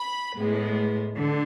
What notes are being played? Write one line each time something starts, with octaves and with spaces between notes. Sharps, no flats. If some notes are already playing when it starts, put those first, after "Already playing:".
Already playing: B5
A2 G#3 B3
D3